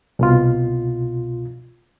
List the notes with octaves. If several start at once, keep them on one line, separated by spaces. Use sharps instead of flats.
C2 B2 F4